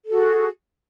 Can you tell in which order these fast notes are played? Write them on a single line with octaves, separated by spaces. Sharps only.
A4 F#4 G#4